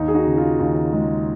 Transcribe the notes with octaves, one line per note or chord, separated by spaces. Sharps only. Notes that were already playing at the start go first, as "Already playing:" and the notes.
Already playing: D#2 D#4
G#4
D#4 F#4
C#3
F4
D#2
G#3